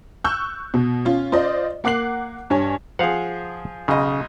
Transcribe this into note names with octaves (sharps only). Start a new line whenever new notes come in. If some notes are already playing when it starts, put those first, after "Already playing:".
C#6 E6 F#6 G6
B2
C#4 F4
F4 C5 D5 D#5
A#3 F#5 D6 F#6 C7 F#7
G2 C#5 G#5
F3 F4 G#4 F5 F#5
B1 C#3 D#5